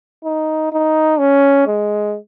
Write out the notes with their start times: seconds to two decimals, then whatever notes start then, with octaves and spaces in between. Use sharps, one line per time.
0.25 D#4
0.72 D#4
1.19 C#4
1.67 G#3